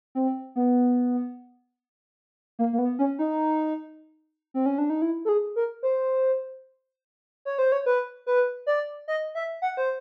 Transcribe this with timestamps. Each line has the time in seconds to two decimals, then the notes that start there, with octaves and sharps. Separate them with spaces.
0.15 C4
0.56 B3
2.59 A#3
2.73 A#3
2.79 B3
2.99 C#4
3.19 D#4
4.54 C4
4.66 C#4
4.78 D4
4.90 D#4
5.02 E4
5.25 A4
5.29 G#4
5.56 A#4
5.83 C5
7.45 C#5
7.59 C5
7.72 C#5
7.86 B4
8.27 B4
8.67 D5
9.08 D#5
9.35 E5
9.62 F#5
9.77 C5